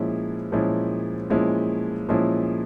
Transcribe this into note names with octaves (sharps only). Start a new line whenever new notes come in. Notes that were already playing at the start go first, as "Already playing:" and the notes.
Already playing: A#2 F3 G#3 C#4 E4
A#2 F3 G#3 C#4 E4
A#2 F3 G#3 C#4 E4
A#2 F3 G#3 C#4 E4